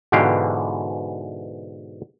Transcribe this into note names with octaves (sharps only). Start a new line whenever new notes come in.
G#2 B2 D3 E3 G4 F5